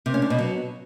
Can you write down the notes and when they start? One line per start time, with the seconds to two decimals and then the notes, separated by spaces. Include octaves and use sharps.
0.06 C3
0.14 C#4
0.22 D4
0.30 B2
0.39 F#3